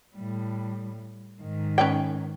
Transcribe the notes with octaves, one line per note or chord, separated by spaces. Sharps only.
A2 G3
G#2 D#3
C#4 B4 G5